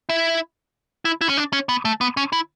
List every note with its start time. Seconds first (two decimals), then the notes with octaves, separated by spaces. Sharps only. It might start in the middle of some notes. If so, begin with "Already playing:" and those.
0.09 E4
1.05 E4
1.21 E4
1.29 C#4
1.37 D4
1.53 C#4
1.69 B3
1.85 A3
2.01 B3
2.17 C#4
2.33 E4